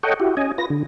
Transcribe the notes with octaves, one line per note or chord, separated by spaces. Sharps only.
A4 C#5 D#5 F#5 G5
E4 F#4 G4
C#4 D#5 G#5
F4 B4 A#6
D3